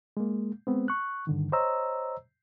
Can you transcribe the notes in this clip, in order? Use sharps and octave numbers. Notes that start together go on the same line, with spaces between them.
G#3 A#3
G#3 B3 C4
C#6 F#6
G2 D3 D#3
C5 C#5 D#5 A#5 E6